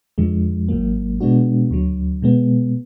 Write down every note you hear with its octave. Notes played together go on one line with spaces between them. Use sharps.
F2 D3 F3 G#3
G#1 G#2 F#3 A#3
B2 G#3 B3 D4 F#4
D2 D3 F#3
B2 G#3 B3